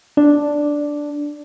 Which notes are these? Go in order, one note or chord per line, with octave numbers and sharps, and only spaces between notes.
D4